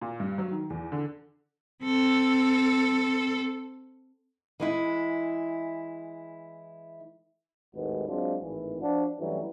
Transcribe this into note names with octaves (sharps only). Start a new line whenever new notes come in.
A#2
G2
F#3
D#3
E2
D3
C4 A4
E3 G#3 E4
G#1 D#2 A2 G#3 F#4 B4
F#3 G#3 C4 D4 F4
G#1 A2 E3
F3 D4 F#4
G2 E3 F#3 G3 A3 C#4